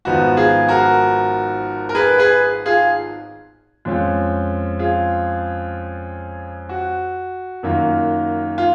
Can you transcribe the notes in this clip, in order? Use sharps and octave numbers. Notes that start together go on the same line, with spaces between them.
G#1 G#2 F3 B3 D#4 F#4
F4 G#4
F#4 A#4
A#4
G#4 B4
G#4 B4
F4 G#4
F2 F3 G#3 C#4 F4
F4 G#4
F#4
F#2 D#3 A#3 F4
F4